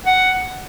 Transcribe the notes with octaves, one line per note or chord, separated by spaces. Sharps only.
F#5